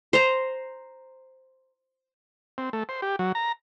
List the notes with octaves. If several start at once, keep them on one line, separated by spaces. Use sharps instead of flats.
C5 A#5
C4
A3
C5
G4
F#3
A#5